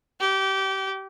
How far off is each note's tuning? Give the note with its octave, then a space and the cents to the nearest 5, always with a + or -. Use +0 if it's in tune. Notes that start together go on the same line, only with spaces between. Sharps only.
G4 -25